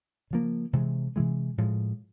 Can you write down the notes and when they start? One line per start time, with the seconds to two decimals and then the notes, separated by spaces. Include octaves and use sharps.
0.31 C#3 F3 A#3
0.73 C3 E3 G#3
1.16 C3 E3 G#3
1.58 A2 F3 G#3